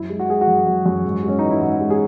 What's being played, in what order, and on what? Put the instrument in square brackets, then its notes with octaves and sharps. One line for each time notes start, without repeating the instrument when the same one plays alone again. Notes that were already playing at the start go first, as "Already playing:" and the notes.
Already playing: [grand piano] F#2 E4
G#3
F#4
G#3 G#4
F#4
F#2
F#2
F#2
G#2
G#3 C#4
E3 D#4
E4
G#2 F#4
G#3
G#4